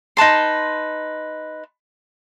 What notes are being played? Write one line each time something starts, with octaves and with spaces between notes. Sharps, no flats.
D#4 B4 A5 C6